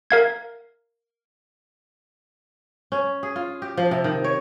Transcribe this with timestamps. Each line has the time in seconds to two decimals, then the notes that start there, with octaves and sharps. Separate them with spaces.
0.11 A#4 F5 G#6
2.92 C#4
3.23 G#4
3.36 F4
3.62 G4
3.77 F3
3.91 C3
4.04 D#3
4.24 C#5